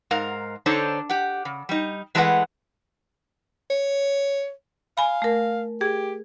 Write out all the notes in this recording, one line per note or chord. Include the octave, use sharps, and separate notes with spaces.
G#2 A#4 F5
D3 D4 D#4 A4 C5 C#5
G4 F#5
C#3
G3 D#4
E3 G#3 A3 A4 B4 F#5
C#5
F5 G#5 B5
A3 A#4
G4 G#4